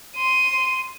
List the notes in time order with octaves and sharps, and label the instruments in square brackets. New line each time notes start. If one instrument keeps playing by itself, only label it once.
[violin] C6 D#7